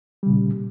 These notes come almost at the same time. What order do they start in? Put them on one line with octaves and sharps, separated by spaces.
G3 C#3 A#2